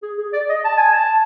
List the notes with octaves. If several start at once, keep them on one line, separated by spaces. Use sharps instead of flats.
G#4
G#4
D5
D#5
A5
G#5
A5